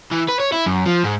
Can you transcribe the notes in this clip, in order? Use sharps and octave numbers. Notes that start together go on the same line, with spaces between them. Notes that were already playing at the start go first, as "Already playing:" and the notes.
E3
B4
C#5
E4
F#2
F3
G#2